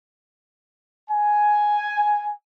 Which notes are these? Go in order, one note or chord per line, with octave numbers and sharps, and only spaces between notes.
G#5